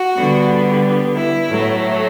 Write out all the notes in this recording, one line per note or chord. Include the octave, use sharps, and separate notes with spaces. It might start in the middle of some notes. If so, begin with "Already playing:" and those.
Already playing: F#4
D3 G3 B3
E4
A2 F#3 A3